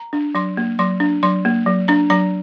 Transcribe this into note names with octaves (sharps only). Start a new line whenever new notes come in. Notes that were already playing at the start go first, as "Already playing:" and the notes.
Already playing: A#5
D4
F#3 C6
A#3
F#3 C6
D4
F#3 C6
A#3
F#3
D4 A#5
F#3 A#5